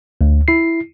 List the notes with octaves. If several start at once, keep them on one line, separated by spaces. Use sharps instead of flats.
D2
E4 C7